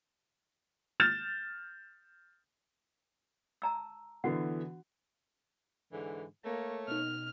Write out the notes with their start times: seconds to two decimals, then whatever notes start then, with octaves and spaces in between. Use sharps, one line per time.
1.00 F6 G6 A6 E7
3.62 A5 A#5 E6
4.24 D3 E3 B3 F#4 F#5
5.93 G#2 D3 E3
6.44 A3 A#3 C#5
6.88 B2 D#4 F6